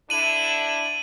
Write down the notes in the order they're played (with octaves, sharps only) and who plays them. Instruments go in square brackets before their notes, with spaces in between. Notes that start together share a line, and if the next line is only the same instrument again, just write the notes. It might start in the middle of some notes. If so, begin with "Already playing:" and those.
[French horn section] D3 D4 E4 [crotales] D#7 F#7